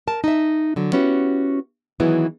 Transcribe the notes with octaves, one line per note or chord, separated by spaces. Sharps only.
A#4 A5
D#4 E5
D3 F#3
B3 C#4 E4 F#4 G4
D#3 E3 F#3 B3 E4 G#4